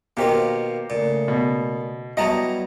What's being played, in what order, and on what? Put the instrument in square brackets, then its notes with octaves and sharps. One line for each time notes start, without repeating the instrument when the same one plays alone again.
[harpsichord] B2 D#3 F4 [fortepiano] A#3 G4 C5
[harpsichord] A#2 [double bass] C#3 A3
[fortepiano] B2
[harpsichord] F#3 B3 E4 [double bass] G3 [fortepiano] D#5 A5 A#5